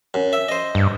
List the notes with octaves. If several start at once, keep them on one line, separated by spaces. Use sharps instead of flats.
F#2
E5
C5 D#5
G2